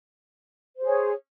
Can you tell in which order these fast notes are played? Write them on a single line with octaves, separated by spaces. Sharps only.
C5 G#4 C#5